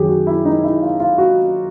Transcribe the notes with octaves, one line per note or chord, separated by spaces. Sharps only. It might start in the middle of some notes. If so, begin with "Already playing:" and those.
Already playing: F#2 D#3 F#3 G4 G#4
F#4
E4
D#4
E4
F4
F4
F#4